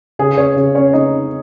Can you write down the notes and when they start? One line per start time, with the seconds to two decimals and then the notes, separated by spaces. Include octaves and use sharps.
0.19 C#3 G#4 G#5
0.38 C#4 C#5
0.56 C#3
0.75 C#4 C#5
0.93 C#3 D#4 D#5